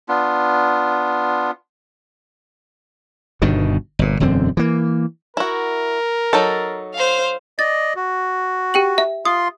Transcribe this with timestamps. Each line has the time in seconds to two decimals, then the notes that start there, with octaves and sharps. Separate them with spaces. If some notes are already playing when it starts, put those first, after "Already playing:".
0.09 B3 D4 F4
3.42 G1 G2 B2 D#3
3.99 G1 A#2
4.20 E1 F#2 D3 C4
4.57 E3 A#3
5.37 E4 F#4 A#4
6.33 F#3 D#4 A4
6.94 C5 F5
7.59 D5 D#5 A6
7.96 F#4
8.74 G4 G5 F#7
8.98 E5
9.25 F4 C6 D#6